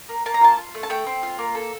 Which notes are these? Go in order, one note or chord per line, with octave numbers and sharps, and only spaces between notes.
A#3
A#3 A5
A#5
F4 A5
F4
A3
A5
A3 G5
C4
F4
A#3
A4